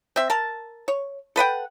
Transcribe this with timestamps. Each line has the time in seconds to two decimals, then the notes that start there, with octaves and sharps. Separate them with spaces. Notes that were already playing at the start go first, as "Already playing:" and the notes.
0.16 C4 E5
0.30 A#4 A5
0.88 C#5
1.36 A4 B4 F#5 G5